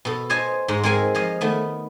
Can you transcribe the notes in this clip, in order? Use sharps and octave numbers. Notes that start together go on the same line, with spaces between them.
B2 A4
C5 C#5 D#5 G#5 A5
G#2 D#4 A#5 C6
G#3 C4 A4 A#4 C#5 G#5
F3 C#5 D#5 F5
D#3 A3 B3